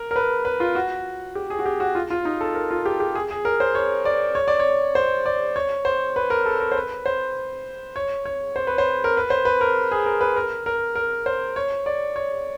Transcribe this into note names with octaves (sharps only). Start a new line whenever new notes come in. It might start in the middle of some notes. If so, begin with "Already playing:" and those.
Already playing: A#4
A#4
B4
B4
F4
F#4
G4
G#4
F#4
G4
F#4
F4
F4
D#4
A4
A#4
F4
G4
G4
G#4
G#4
A#4
C5
C#5
D5
C#5
D5
C#5
C5
D5
C#5
C5
B4
A#4
A4
A#4
C5
B4
C5
C#5
C#5
C5
B4
C5
A#4
B4
C5
B4
A#4
G#4
A#4
B4
A#4
A#4
A#4
C5
C#5
D5
C#5